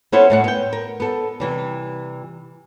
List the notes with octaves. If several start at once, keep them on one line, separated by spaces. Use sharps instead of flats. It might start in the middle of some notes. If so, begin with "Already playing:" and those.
B3 C#4 E4 A4 C5 C#5
A2 A3 F#5
B3 G5
A#4
B3 A4
C3 E3 G3